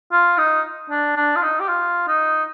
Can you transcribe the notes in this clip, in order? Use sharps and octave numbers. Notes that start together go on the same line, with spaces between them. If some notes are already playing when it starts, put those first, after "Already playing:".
F4
D#4
D4
D4
F4
D#4
G4
F4
D#4